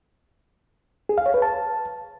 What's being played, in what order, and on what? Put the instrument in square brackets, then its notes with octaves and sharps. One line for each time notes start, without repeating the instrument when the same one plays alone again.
[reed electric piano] G#4
F5
C#5
B4
A5